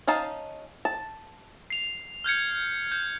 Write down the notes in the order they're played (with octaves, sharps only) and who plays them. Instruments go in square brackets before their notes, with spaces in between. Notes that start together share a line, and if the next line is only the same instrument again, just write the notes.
[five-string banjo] C#4 D#4 F5 A5
A5
[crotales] C7 F7
F6 G6 G#6 C#7
G6